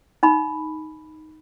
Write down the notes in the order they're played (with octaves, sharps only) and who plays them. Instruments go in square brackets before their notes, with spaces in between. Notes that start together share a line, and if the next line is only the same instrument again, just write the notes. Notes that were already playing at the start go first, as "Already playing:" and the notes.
[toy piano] D#4 B5